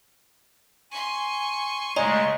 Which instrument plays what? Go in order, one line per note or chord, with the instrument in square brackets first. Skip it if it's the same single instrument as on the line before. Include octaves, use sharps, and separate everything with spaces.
[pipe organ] G#5 [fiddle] C6 C#6
[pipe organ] C#3 G#3 A3 [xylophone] C#5 G#5 A#5 [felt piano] D#5